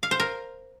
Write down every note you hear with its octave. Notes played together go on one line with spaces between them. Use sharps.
F5
C5
A#4